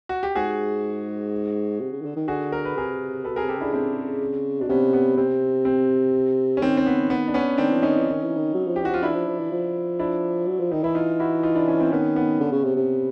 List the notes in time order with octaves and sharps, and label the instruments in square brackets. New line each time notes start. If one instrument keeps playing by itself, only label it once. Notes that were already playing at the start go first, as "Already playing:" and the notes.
[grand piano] F#4
G4
[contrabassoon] G#2 [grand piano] F#4 G#4
[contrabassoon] C3
C#3
D#3
D3
D#3
[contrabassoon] D3 [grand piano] F#4 G#4
[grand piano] A#4
B4
[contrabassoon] C3 [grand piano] G#4 A#4
[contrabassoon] B2 [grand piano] A4 B4
[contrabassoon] C3 [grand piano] G#4 A#4
[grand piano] G4 A4
[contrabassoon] C#3 [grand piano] D4 E4
[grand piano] C4 D4
[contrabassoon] B2 [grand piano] D4
[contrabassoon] C3 [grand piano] B3 C#4
[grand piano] B3
[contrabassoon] C3 [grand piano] C4
[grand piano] C4
C#4
[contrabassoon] D#3 [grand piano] C4
[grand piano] C4
B3
B3
D4
B3 C#4
[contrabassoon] D#3 [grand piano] C4 D4
[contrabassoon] E3
[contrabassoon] D#3 [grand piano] C#4 D#4
[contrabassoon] E3
D#3
E3
D#3
F#3
F3
[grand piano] G4
[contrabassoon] E3 [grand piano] F#4
[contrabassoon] F3 [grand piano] F4
[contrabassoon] E3 [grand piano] D4 E4
[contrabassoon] F3
F3
E3
F3
[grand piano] D4 E4
[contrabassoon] F#3
F3
[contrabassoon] D#3 [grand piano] D#4
[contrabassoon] E3 [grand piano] E4
[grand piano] D#4 F4
E4 F#4
D#4 F4
D4 E4
C#4 D#4
C4 D4
[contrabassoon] D#3 [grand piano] B3 C#4
[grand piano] B3
[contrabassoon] D3
C#3
C3
C3